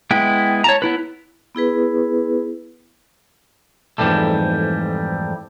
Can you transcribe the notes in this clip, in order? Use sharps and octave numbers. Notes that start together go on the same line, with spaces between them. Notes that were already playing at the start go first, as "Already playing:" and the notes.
G#3 B3 E4 G5
C#5 A5 A#5
B3 E4 B4
B3 E4 G#4 B4
F2 G#2 D3 E3 G3 A3